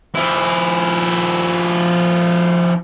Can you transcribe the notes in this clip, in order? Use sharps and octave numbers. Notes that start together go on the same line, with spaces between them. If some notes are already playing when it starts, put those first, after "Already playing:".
F3 E4